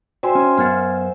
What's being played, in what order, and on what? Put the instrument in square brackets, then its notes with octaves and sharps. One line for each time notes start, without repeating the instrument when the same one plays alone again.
[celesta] F#4 G5 [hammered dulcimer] C5 E5 G#5
[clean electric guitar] C#4
[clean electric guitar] F#2 A#4 F#5 [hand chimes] B3 [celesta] F6 G#6 A6